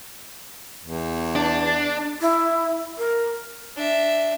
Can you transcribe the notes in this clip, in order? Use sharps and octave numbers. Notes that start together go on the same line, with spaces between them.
E2
D4
E4
A#4
D4 E5